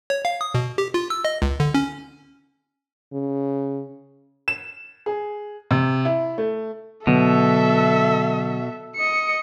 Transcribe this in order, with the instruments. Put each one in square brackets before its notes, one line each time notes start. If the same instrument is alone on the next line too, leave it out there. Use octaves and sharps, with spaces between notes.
[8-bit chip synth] C#5
F5
D#6
B2
G4
F4
E6
D#5
C#2
D3
C#4
[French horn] C#3
[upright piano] E7
G#4
C3
E4
A3
[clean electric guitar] B2 [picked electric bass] D3 F#3 B3 [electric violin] A4 E5
[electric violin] D#5 C#7